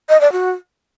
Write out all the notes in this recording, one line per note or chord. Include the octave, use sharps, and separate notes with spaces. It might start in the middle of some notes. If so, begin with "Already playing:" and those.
D#5
D5
F#4